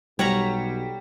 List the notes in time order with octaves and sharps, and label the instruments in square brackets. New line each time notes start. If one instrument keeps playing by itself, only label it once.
[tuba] B1 [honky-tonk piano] G3 G4 [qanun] C#5 F#5 A#5